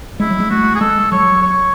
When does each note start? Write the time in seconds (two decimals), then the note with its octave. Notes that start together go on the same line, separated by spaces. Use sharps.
0.20 G#3 E4
0.30 F#3
0.40 G#3
0.51 A3 F#4
0.75 G#4
0.80 G#3 A4
1.12 F#3 C#5
1.42 C#5